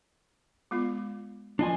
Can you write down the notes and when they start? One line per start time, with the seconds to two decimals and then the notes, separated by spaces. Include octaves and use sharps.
0.71 G#3 B3 F4
1.59 F3 D4 F4 D#5 G#5